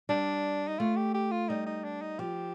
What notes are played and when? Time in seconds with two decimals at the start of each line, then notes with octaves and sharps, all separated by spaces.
0.09 G3 D4
0.68 D#4
0.79 A3 F4
0.96 G4
1.14 G4
1.31 F4
1.49 G3 D#4
1.66 D#4
1.84 D4
2.02 D#4
2.19 F3 G4